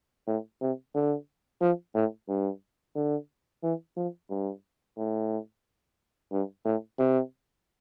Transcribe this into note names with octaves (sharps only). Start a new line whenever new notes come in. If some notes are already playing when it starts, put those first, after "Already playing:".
A2
C3
D3
F3
A2
G2
D3
E3
F3
G2
A2
G2
A2
C3